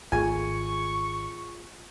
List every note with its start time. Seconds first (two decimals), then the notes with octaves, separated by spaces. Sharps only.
0.12 G#1 A3 F4 G#4 G#5 C#6